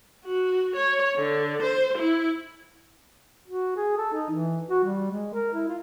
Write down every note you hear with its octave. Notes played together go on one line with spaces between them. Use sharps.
F#4
C#5
D3
C5
E4
F#4
G#4
A4
D#4
E3
F#4
G3
G#3
A#4
E4
F4